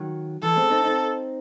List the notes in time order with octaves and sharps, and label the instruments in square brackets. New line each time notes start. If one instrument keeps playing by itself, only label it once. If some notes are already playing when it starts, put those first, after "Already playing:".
Already playing: [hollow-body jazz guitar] D#3 F#3
[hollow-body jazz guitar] E3 [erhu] A4
[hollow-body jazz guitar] G#3 C4
C4 D#4
C4 D#4